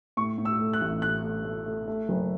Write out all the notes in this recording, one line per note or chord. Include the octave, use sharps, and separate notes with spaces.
A2 C#6
A2
E6
A3
F#6
A1
A2 F#6
A3
A3
A3
A3
F#1